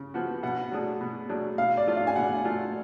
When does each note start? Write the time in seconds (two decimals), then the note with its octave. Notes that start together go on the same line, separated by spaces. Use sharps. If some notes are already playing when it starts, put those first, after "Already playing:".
Already playing: C#3
0.14 F3 B3 F#4
0.43 B2 F#5
0.72 F#3 A3 D4 G#4
1.01 B2
1.29 F#3 A3 D4 G#4
1.58 B2 F5
1.77 D5
1.87 F#3 A3 F4
1.97 F5
2.07 G#5
2.16 B2 F#5
2.44 F#3 A3 F4